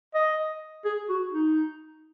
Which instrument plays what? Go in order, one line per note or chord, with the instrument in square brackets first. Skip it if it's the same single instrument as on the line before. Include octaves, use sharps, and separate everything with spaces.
[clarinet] D#5
G#4
F#4
D#4